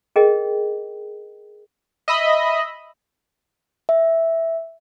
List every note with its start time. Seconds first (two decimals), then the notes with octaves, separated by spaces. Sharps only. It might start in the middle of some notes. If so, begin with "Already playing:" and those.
0.16 G#4 A#4 D#5 G5
2.08 D#5 E5 B5
3.89 E5